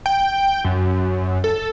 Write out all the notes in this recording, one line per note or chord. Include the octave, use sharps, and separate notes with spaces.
G5
F#2
A4